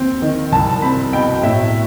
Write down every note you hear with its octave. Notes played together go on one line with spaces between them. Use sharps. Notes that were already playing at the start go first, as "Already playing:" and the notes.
Already playing: D#2 C4 G5
D#3
C2 A5
C4 B5
B2 G5
A2 E5